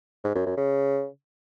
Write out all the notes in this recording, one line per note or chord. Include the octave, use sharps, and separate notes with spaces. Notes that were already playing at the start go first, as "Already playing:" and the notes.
G#2
F#2
F#2
C#3